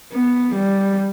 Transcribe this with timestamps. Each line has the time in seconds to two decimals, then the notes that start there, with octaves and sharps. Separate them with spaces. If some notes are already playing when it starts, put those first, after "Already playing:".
0.13 B3
0.56 G3